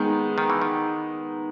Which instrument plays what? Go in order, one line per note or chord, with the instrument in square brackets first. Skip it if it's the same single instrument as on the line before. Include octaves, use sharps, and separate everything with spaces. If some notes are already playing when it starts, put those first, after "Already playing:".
Already playing: [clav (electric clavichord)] D#3 [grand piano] G#3 B3 D#4
[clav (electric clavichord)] D#3
E3
D#3